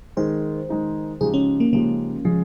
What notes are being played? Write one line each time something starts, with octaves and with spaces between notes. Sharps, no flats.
D#3 G#3 D#4 G#4 C5
D#3 G#3 D#4 G#4
C#3 F3 G#3 D#4 G4 G#4
C#4
A#3
C#3 F3 G#3 A#3 D#4 G4
C#3 F3 G#3 C#4 G#4